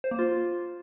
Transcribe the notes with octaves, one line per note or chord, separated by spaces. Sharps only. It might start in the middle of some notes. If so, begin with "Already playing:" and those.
C5
A#3
F4